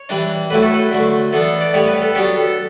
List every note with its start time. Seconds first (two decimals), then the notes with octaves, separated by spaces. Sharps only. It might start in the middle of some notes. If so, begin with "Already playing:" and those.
Already playing: C#5
0.09 E3 G3 D4
0.50 A2 F#3 A3 E4 B4
0.63 A4
0.74 B4
0.91 D3 F#3 A3
1.33 E3 B3 D4 A4
1.61 D5
1.74 A2 G3 B3 C#5
1.88 B4
2.02 A4
2.15 F#3 B3 D4 G4
2.36 A4